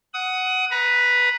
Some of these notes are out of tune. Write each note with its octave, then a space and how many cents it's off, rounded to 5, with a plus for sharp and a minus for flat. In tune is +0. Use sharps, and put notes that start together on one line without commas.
F#5 +5 D#6 +20
B4 +0 A#5 +25